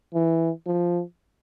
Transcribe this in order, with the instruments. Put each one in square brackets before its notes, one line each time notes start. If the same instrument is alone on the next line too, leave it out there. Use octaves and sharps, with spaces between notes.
[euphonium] E3
F3